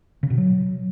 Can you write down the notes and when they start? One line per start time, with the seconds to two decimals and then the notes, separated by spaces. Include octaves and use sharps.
0.23 C#3
0.30 B2
0.38 F#3